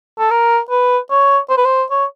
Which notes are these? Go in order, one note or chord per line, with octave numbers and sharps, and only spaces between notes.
A4
A#4
B4
C#5
C5
B4
C5
C#5